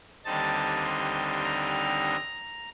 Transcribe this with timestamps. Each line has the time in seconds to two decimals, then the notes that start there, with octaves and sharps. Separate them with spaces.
0.25 D#2 D3 G3 C4 D#4 A5
0.85 C6
1.44 A#5